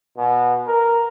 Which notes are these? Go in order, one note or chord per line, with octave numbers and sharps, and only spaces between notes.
B2
A#4